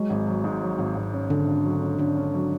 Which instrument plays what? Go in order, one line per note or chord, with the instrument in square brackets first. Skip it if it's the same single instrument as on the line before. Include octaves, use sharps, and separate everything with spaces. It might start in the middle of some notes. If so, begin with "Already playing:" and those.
Already playing: [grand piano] F#3 [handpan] G#3
[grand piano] G#1
F#3
G#2
F#3
G#1
G#1
C#4
[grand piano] G#1 [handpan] D3 D4
[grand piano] G#1
F#3
C#4
[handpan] D3 D4 [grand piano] C#4
[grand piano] C#4
F#3